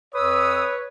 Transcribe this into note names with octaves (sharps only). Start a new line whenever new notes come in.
F2 B4 C#5 D#6 E6